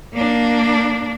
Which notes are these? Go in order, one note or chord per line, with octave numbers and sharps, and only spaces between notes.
A#3 D4